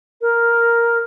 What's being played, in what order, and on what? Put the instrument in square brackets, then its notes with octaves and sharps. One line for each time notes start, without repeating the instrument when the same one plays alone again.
[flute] A#4